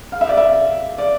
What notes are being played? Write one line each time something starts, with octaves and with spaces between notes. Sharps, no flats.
F5
E5
D5
E5
D5